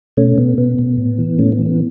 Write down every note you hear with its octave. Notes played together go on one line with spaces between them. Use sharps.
B2 A3 C#4
B2 B3
B2 B3
B2
A2
E3
A2 A3 C#4
B3
E3
B3